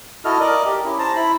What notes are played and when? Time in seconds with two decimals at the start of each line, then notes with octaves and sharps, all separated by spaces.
0.25 E4 F#4 A4 D#5 F6
0.40 A#4 D5 D#5
0.66 G4
0.84 C#4 E4
0.99 C5 A5 A#5
1.16 E4 B5